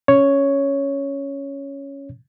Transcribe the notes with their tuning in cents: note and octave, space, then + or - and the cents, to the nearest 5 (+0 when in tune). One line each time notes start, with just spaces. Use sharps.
C#4 +0 C#5 +5